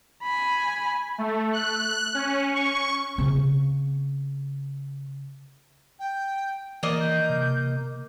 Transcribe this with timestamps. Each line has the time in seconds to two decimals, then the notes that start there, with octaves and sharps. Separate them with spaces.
0.23 G#5 B5
1.18 A3
1.53 F#6
2.14 C#4
2.54 C#6
3.18 C#3 C4
5.99 G5
6.83 E3 A#3 D5 D#5
7.00 G6
7.30 C3